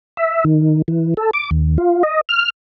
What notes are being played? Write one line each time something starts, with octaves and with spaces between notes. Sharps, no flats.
E5
D#3
E3
A4
D6
D#2
F4
D#5
F6